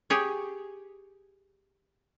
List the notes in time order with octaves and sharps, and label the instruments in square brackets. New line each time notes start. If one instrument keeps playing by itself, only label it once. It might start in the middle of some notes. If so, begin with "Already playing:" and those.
[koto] G4 G#4 C#5